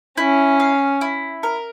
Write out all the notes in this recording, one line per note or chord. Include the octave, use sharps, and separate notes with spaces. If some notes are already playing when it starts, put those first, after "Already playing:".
C#4 E4
F5
E4
A#4